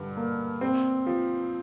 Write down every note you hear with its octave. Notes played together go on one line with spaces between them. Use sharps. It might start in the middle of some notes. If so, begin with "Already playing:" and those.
Already playing: G2 D3
A#3
C4
F3